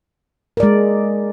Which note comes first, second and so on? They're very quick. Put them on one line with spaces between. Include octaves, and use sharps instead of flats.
A#4 D5 G#3